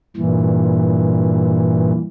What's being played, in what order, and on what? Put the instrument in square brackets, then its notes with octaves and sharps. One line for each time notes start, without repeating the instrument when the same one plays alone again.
[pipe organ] G2 A#2 E3